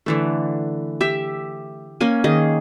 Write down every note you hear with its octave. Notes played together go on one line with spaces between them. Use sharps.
D3 E3 A3
G4 E5
A#3 C#4 G#5
D#3 G#4 D#5